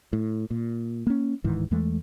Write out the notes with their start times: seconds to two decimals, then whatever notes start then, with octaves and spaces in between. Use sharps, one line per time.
0.13 A2
0.50 A#2
1.07 A#3 C#4
1.44 D1 G#2 D#3 E3
1.71 E2 E3 G#3 A3